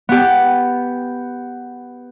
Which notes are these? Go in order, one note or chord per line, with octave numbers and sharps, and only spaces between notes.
B3 G4